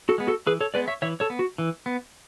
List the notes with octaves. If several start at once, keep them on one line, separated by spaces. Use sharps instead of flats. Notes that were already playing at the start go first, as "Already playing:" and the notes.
F#4 A4
G#3 B3
F#4 A4
E3 G#4 B4
A4 C#5
G#3 B3 B4 D5
C#5 E5
E3 C#5 E5
A4 C#5
B3
F#4
E3
B3